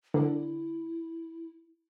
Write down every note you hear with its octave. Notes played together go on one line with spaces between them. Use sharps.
D3 E4